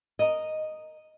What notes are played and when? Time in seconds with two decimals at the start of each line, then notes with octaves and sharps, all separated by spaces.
0.19 A#4 D#5